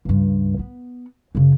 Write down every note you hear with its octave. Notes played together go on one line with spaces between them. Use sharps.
C#2 G2
B3
F#2 C#3